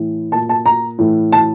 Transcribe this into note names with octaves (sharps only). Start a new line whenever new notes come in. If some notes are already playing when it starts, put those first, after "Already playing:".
Already playing: A2 E3
A#2 A5
A5
A#5
A2 E3
A5